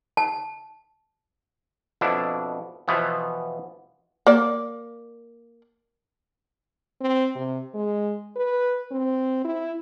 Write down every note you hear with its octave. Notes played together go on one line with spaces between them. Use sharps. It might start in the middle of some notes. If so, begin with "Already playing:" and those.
A5
F2 B2 D4 E4
B2 E3 F3 B3
A#3 D5
C4
C3
G#3
B4
C4
E4